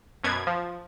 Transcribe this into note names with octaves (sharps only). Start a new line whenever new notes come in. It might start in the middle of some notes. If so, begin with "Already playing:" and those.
F#2 B2 G#6
F3